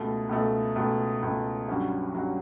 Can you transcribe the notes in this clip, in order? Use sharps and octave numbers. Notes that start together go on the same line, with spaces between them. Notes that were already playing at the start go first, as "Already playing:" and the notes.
Already playing: C#2 B2 A3
C#2 B2 A3
C#2 B2 A3
C#2 B2 A3
G2 F#3 C#4 F#4
G2 F#3 C#4 F#4